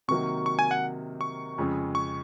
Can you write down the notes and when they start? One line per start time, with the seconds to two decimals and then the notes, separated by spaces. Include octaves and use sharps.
0.08 C3 D#3 F#3 A#3 C#6
0.46 C#6
0.59 G#5
0.71 F#5
1.21 C#6
1.58 F2 C#3 G#3
1.95 C#6